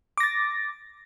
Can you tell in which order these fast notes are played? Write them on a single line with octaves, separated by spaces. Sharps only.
D6 A#6 A6